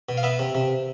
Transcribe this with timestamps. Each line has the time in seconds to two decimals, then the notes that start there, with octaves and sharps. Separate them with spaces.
0.09 B2
0.17 F5
0.23 B3 E5
0.39 C3
0.55 C3